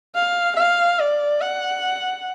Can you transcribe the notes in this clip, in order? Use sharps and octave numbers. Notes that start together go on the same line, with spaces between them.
F5
F5
D5
F#5